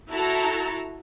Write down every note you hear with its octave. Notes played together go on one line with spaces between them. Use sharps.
E4 F#4 A4 A5 A#5